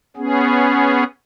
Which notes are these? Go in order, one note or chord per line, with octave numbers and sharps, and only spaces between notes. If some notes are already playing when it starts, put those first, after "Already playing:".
B3 C#4 G#4